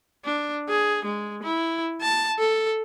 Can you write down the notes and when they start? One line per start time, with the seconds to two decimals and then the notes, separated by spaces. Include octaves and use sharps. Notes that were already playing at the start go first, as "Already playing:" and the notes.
0.25 D4
0.70 G#4
1.05 G#3
1.43 E4
2.02 A5
2.39 A4